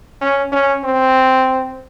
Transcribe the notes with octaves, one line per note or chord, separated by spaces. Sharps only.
C#4
C#4
C4